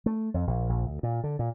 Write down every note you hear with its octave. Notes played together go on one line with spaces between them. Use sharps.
A3
F2
A#1
A#1
D2
A#2
D3
A#2